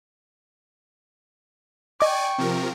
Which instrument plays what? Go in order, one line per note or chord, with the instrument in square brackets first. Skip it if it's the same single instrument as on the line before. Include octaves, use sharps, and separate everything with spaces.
[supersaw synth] D5 G#5 [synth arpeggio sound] D#5 D6 [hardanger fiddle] G5 C#6
[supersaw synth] C3 F3 A#4